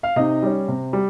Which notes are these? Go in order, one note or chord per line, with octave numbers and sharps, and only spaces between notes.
F5
C3 D#4 D#5
G3 C#4
C3
G3